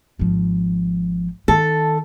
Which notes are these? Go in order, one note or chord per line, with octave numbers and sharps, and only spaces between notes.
G#1 F3
D#3 A4